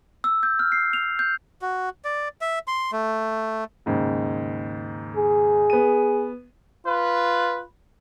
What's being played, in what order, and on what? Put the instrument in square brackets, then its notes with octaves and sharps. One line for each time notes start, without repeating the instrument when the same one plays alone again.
[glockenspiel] E6
G6
F6
C7
F7
G6
[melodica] F#4
D5
E5
C6
A3
[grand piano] D#2 G#2 C#3
[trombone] G#4
[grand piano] B3 D#7
[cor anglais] F4 [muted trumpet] B4